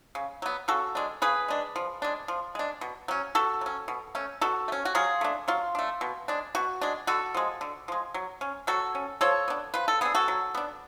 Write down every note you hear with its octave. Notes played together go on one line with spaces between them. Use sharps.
C#3
F#3 B3
C#3 F#4 A4
G#3 D4
C#3 G#4 B4
G#3 D4
F3
G#3 D4
F3
G#3 D4
B2
F#3 C#4
B2 F#4 A4
F#3 C#4
B2
A3 C#4
B2 F#4 A4
A3
C#4
F#4
F#3 F4 G#4
A3 D4
F#3 F4
A3 D4
B2
G#3 D4
B2 F#4
G#3 D4
D3 F#4 A4
F3 G#3
D3
F3 G#3
F#3
C#4
F#3 F#4 A4
C#4
F3 A4 C#5
B3 D4
F3 B4
A4
B3 D4 G#4
F#4 A4
F#3
B3 D4